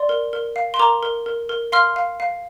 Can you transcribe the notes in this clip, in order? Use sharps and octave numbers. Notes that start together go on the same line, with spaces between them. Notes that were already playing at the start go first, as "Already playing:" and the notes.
Already playing: D5 C6
A#4
A#4
F5
C6
A#4 A#5 D6
A#4
A#4
A#4
F5 C6 F6
F5
F5